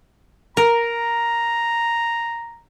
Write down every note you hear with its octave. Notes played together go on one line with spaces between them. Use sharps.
A#4 A#5